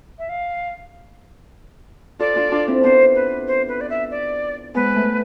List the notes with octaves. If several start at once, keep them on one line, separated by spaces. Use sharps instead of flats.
E5
F5
F4 A4 D5
D4 F4
D4 F4
C4 E4
B3 D4 C5
B4
C5
B4
D5
E5
D5
G#3 B3 B4
A3